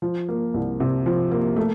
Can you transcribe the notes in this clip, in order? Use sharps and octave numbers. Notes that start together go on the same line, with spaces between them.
F3
A#3
C2
C3
F3
A#3
A3